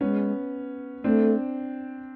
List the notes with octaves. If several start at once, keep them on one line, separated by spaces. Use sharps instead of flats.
G#3 B3 C#4
A3 C4 D4